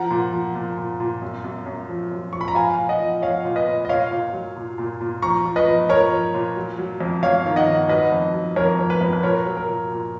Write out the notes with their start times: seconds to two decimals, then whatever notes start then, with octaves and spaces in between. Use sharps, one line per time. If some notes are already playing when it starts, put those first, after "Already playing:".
Already playing: F3 F#5 A#5
0.11 A#2
0.32 F3
0.55 A#2
0.78 A#2
1.00 A#2
1.22 F#2
1.44 F#2
1.66 F#2
1.89 F3
2.12 F#2
2.33 F3 C#6
2.41 B5
2.48 A#5
2.55 F3 F5 G#5
2.77 A#2
2.89 D#5 F#5
3.00 F3
3.22 F3 C#5 F5
3.45 A#2
3.56 B4 D#5
3.67 A#2
3.85 D#5
3.89 A#2 C#5 F5
4.11 A#2
4.33 F#3
4.56 A#2
4.78 A#2
5.01 A#2
5.22 F3 A#5 C#6
5.45 F3
5.56 B4 D#5
5.67 F3
5.89 F3 A#4 C#5
6.12 F3
6.34 A#2
6.56 F#3
6.78 F#3
7.00 F2
7.23 F2 C#5 F5
7.45 D#3
7.56 D#5 F#5
7.68 D#3
7.89 F#3 B4 D#5
8.12 F2
8.34 F#3
8.56 F2 A#4 C#5
8.79 F2
8.90 B4
9.01 F2
9.13 B4
9.23 A#2 A#4 C#5
9.46 F#3
9.57 A#4
9.68 A#2
9.90 A#2